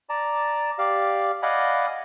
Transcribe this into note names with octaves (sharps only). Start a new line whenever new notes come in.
D5 A5 A#5
G4 D5 F5
D5 D#5 F5 F#5 G#5 B5